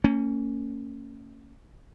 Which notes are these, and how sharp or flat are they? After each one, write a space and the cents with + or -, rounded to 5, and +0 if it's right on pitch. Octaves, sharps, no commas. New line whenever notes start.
A#3 -40 C#4 +0